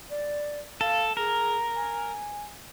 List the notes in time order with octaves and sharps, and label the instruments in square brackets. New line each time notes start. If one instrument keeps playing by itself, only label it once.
[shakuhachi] D5
[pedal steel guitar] A4 [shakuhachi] F5
[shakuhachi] G#4 [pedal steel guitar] A#4
[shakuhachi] G#5